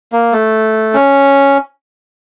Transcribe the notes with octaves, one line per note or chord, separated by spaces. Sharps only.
A#3
A3
C#4